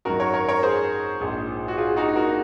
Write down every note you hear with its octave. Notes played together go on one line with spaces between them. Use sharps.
G#1 F#2 D#3 F#3 F#4 A#4
A#4 C#5
A#4 C#5
A#4 C#5
G#4 C5
A#1 G#2 F3 G#3
F#4
F4 G#4
D#4 F#4
F#4 A#4